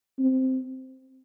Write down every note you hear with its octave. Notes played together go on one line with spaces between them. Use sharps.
C4